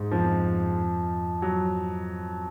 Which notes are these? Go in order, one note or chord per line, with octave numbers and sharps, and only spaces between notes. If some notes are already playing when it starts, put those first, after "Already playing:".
Already playing: G#2 G#3
F2 F3
F#3